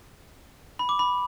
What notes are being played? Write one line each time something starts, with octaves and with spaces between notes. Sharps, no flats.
B5
D6
B5